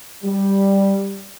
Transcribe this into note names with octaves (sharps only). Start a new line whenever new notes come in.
G3